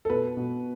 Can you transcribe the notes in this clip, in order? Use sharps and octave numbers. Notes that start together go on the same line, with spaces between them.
A4
B2 B4
B2